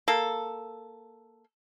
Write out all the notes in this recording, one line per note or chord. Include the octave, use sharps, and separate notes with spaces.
A#3 A4